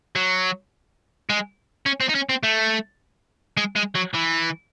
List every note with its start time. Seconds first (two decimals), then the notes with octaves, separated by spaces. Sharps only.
0.16 F#3
1.30 G#3
1.86 C#4
2.01 C4
2.09 D#4
2.15 C#4
2.29 C4
2.43 A3
3.57 G#3
3.76 G#3
3.95 F#3
4.15 E3